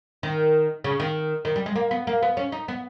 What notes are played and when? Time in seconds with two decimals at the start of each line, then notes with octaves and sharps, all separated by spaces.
0.23 D#3
0.84 C#3
1.00 D#3
1.45 D#3
1.56 G3
1.66 G#3
1.75 A#3
1.91 B3
2.07 A#3
2.22 B3
2.37 C#4
2.52 D#4
2.68 B3